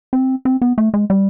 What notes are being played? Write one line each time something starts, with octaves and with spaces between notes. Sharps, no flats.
C4
C4
B3
A3
G#3
G3